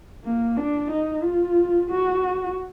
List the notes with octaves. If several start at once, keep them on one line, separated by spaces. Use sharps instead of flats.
A#3
D4
D#4
F4
F#4